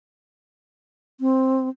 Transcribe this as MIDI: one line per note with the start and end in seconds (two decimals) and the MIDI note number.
1.21 1.69 60